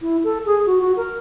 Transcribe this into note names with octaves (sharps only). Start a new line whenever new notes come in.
E4
A4
G#4
F#4
F#4
A#4